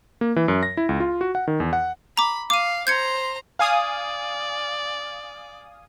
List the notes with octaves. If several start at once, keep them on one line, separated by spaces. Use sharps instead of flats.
A#3
E3
F#2
A#6
E4
C#2
F4
F#4
F#5
D#3
E2
F#5
A#5 B5 D6
F5 D6 D#7
C5 A#5 G6 G#6 C#7
D5 F5 G#5 D#6